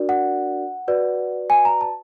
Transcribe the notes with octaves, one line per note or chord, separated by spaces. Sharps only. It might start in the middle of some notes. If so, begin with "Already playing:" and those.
Already playing: D4 F#4 A#4 D5
F#5
F#4 B4 D5
G#5
A#5
A5